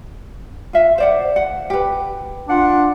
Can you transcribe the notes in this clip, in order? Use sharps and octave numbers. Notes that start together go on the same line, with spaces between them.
F4 E5
C5 D5 F#5
F#5
G4 B4
D4 F4 F#5